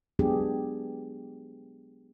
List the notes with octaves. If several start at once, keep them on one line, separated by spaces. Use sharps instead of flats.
F#3 G#3 B3 D4 G4 G#4